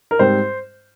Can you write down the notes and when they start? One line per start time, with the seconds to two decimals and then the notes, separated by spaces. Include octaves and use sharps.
0.11 A#4
0.19 G#2 G3 C4 C5